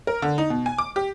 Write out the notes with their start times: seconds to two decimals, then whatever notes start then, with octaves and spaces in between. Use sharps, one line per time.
0.07 A#4
0.22 D3
0.38 D#4
0.50 B2
0.66 G#5
0.78 D6
0.96 G4